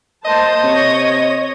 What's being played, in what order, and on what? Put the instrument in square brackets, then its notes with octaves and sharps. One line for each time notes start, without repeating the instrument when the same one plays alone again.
[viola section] A#3 C5 A5 [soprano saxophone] D#5
[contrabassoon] C3 [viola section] C#5